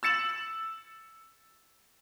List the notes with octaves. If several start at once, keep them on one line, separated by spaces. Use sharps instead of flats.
E6 A6 C#7 E7 F#7